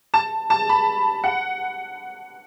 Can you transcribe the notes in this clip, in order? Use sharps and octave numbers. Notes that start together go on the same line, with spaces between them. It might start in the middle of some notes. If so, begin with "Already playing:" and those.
A5
A5
B5
F#5